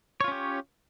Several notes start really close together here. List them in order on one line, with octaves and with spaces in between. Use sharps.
C#5 F4 C#4 G4